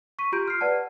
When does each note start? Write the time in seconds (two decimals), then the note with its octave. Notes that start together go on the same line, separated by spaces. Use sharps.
0.19 C#6 B6 D#7
0.32 F4 G4 A#5 C6 G6 D7
0.48 F6 C7
0.61 B4 D5 F#5 A5